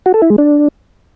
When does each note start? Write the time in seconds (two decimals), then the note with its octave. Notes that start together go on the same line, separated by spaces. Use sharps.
0.06 F#4
0.14 A4
0.22 E4
0.30 G#3
0.38 D4